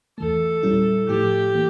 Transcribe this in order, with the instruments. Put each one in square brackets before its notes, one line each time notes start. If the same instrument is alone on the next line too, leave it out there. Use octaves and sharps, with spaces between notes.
[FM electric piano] E2 E3 A3 [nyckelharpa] A4
[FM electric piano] A#2 G3 C#4 E4
[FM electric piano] A2 F3 A3 E4 [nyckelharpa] G4
[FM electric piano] E3 A#3